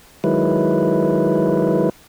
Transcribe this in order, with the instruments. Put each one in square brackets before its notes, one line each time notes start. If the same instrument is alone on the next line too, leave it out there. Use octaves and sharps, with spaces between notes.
[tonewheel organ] D#3 F#3 G#3 E4 B4